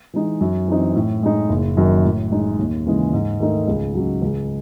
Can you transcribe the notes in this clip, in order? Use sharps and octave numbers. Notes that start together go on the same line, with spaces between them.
E3 G#3 D#4
F#2
E3 C4 D#4
A2
G#3 D#4
F#1
F#2 D#3
A2
G#3 D#4
D#2
C#3 E3 G#3
G#2
D#3 A3 D#4
C#2
C#3 F#3
C#2